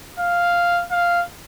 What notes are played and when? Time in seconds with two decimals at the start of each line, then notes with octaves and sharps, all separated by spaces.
0.19 F5
0.91 F5